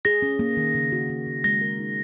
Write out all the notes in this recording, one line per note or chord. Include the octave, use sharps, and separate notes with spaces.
G#4 A#6
C#4
A#3
D#3
C#3
F#4
A#3
C#3
G#3 A#6
A#4
D#4